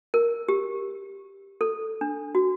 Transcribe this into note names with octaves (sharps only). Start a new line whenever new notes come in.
A#4
G4
A4
D4
F#4